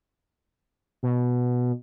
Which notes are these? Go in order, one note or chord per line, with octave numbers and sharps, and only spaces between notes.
B2